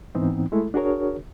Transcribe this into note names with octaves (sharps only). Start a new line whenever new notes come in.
G#2 E3 B3 C4 D#4
G#3 A3 E4 A4
D4 F#4 G#4 A#4 C#5